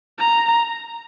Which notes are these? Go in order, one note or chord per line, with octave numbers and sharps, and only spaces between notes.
A#5